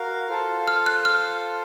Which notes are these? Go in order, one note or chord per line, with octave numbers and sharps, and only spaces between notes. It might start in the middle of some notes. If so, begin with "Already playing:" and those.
Already playing: F#4 A#4 F5
F4 A4 C5 F5 A5
F6
F#6
F6